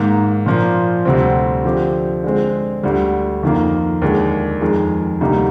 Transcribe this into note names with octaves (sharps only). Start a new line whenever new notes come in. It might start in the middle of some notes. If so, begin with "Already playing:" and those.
Already playing: G#2 D#3 A#3
A#2 F3 A#3
D2 C3 G3 C4
D3 F3 C4 G4
D3 G#3 C4
D2 D3 G3
F2 D#3 A#3
D#2 D3 G#3
F2 D#3 G#3
D2 C3 G3 A#3 D#4